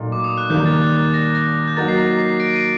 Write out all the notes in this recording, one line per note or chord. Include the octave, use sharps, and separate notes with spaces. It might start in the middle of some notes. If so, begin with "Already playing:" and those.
Already playing: A#2 F#3 A3 D#4
D6
D#6
F#6
D#2 D#3 G3 A#3 G6
A6
G6
A6
A#6
A#6
G6
F#3 A#3 D#4 F#4 A6
C7
A#6
C7
C7
A#6 D7
C7 D#7